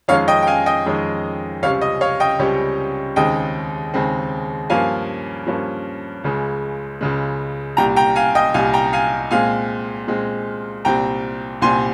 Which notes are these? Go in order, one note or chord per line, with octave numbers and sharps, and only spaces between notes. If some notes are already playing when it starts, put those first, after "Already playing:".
F2 D#3 G#3 C#4 C#5 F5
D#5 G5
G5
F5 G#5
D#5 G5
F2 D#3 G#3 C#4
C#2 C3 G3 C#4 C#5 F5
D#5
C#5 F5
D#5 G5
C#2 C3 G3 C#4
D#2 C#3 G#3 C4 D#5 G5
D#2 C#3 G#3 C4
G2 F3 A#3 C#4 F5 G#5
G2 F3 A#3 C#4
C#2 C#3 G#3
C#2 C#3 G#3
C2 A#2 G3 G5 A#5
G5 A#5
F5 G#5
D#5 G5
C2 A#2 G3 F5 G#5
G5 A#5
F5 G#5
A#2 G#3 C4 F5 G#5
A#2 G#3 C4
C2 A#2 G3 C4 G5 A#5
C2 A#2 G3 C4 G#5 C6